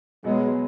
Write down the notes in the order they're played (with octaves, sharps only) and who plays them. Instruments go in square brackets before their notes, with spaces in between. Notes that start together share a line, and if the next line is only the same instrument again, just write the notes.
[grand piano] B2 F#3 B3 [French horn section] G#3